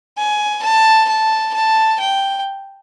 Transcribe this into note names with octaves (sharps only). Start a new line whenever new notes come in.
G#5
A5
A5
A5
G5